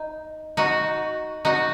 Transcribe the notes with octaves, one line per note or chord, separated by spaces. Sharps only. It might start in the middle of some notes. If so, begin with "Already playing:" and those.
Already playing: D#4
D#4 F#4
D#4 F#4